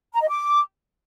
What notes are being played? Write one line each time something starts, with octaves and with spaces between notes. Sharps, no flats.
A#5
D#5
D6